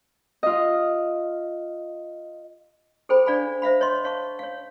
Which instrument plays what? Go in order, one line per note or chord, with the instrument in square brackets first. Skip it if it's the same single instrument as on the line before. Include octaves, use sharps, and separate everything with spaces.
[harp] F4 D#5
[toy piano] G#4 A4 C5 G5 B5
D4 D5 F5 G#5 B5
C5 E5 F5 B5
C#5 D#5 C6
C#5 F5 A5 C#6
C#5 F5